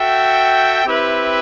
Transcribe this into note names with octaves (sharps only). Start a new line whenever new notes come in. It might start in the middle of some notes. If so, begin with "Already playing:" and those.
Already playing: F#4 A4 E5 G5
C4 E4 G4 B4 E5